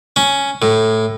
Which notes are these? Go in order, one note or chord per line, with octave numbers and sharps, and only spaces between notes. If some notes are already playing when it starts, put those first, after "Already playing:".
C#4
A2